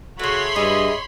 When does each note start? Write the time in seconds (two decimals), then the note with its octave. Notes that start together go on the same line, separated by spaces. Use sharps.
0.19 C#3 A3 F#4 C#5 B5 C6
0.56 G2 G#4 D#5 E5